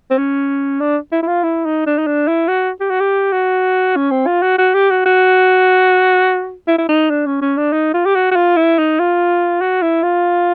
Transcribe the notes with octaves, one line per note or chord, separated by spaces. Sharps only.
C4
C#4
D4
E4
E4
F4
E4
D#4
D4
D#4
D4
E4
F#4
G4
F#4
G4
F#4
C#4
C4
F4
F#4
F#4
G4
F#4
F#4
E4
E4
D#4
D4
C#4
C#4
D4
D#4
F4
G4
F#4
F#4
F4
E4
D#4
F4
F#4
E4
F4